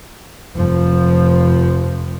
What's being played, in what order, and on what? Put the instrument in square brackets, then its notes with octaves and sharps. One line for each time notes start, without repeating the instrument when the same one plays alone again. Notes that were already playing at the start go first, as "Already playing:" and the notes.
[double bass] F1 F3